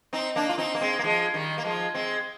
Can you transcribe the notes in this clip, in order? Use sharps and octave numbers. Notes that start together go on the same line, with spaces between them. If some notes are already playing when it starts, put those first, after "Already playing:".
C4 D#4
A#3 D4
F4
C4 D#4
A#3
G#3 C4
A#3
F3 G#3
D#3 G3
A#3
F3 G#3
G#3 C4